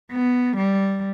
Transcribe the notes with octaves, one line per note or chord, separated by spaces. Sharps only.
B3
G3